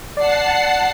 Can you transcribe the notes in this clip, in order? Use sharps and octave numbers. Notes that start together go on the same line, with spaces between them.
D5 F#5 A5 C7